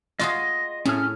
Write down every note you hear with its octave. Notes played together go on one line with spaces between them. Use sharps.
F4 F#4 G#4 D#5 C6
A2 C#4 G#4 F6